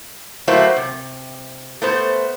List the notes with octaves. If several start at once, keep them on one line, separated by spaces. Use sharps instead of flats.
F#3 A3 A#3 E4 C5 E5
C3
A3 B3 C5